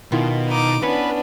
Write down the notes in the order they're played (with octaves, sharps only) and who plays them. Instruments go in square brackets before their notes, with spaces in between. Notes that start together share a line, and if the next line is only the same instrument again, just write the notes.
[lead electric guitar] B2 [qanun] D#3 E4 F4
[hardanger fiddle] D#4 D6
[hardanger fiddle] B3 D4 [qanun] C#4 C#5 [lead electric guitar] B4